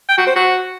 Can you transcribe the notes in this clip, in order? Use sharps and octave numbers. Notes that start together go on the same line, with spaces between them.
G5
F#4
C5
F#4